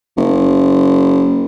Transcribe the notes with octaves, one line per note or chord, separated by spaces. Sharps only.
F#1